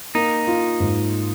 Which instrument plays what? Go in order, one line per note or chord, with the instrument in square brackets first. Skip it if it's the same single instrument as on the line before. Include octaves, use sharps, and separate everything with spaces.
[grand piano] A#3 [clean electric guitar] D#4
[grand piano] F4
G#2